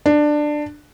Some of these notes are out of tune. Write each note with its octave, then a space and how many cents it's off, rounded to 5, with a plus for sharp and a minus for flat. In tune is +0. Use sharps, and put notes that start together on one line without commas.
D4 +15